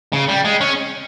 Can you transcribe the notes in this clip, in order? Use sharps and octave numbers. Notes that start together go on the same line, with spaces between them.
C#3
G3
G#3
C#4